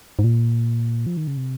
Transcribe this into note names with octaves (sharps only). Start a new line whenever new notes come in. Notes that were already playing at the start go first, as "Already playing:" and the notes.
G#2
A#2
F3
D#3
C#3
C3